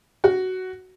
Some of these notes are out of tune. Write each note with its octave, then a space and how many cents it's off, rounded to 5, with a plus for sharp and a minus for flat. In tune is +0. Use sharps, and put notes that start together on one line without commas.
F#4 +10